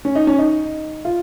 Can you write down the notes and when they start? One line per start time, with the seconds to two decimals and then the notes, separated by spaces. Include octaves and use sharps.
0.05 C#4
0.15 D#4
0.27 C#4
0.38 D#4
1.05 F4